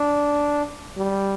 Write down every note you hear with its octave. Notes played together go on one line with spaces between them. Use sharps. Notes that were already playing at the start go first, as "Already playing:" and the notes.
Already playing: D4
G3